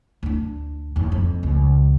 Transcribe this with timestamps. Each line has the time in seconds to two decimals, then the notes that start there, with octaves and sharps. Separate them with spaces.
0.23 D2 D4
0.96 D#1 D#2
1.12 F2
1.43 C#2